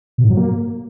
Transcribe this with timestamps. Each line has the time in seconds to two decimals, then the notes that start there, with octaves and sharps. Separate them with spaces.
0.18 B2
0.24 G#2
0.31 F#3
0.37 A#3